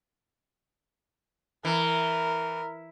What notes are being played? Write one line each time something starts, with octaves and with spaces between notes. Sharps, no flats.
E3 A#4